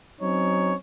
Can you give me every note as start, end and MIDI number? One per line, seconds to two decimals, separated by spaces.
0.20 0.74 54
0.20 0.74 60
0.20 0.74 61
0.20 0.74 63
0.20 0.74 73